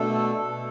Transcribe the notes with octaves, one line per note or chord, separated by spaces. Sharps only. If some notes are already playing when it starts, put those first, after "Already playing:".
Already playing: B2 A3 D4 A4
B2 A3 D4